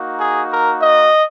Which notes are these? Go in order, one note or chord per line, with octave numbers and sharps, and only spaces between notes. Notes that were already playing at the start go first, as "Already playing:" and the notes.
Already playing: A#3 D#4 F#4
G#4
A#4
D#5